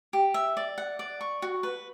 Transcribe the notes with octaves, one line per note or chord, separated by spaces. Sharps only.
G4
E5
D5
F#5
D5
C#6
F#4
B4